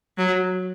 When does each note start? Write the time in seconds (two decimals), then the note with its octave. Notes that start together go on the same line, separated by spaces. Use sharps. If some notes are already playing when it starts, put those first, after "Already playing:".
0.18 F#3